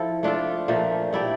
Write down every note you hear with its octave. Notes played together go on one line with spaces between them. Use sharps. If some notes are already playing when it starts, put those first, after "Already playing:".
Already playing: F3 E4 A4
A3 D4 F4 A4
A#2 F3 A3
A3 E4 G4 D5